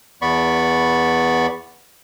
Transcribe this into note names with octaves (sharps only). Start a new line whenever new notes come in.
E2 B3 D5 B5 C#6